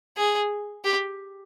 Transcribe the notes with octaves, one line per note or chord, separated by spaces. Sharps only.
G#4
G4